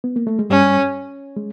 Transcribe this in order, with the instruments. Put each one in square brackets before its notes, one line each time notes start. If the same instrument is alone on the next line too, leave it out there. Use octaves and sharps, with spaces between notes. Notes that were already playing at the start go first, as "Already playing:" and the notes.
[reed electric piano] B3
A#3
A3
G#3
[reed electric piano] G2 G3 [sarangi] C#4
[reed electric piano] G#3